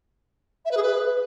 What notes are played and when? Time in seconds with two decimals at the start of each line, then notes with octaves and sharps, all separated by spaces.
0.65 E5
0.71 B4
0.77 G#4
0.82 B4